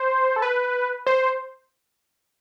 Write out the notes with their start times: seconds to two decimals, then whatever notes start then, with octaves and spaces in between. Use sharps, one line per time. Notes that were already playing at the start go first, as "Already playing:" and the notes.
Already playing: C5
0.36 A4
0.42 B4
1.07 C5